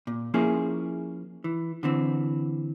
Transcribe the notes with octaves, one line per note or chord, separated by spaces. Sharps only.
A#2
F3 A#3 C#4 E4 G#4
E3
D3 E3 C4